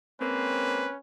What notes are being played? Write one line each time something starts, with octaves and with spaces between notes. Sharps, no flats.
G#3 A#3 C4 C#4 B4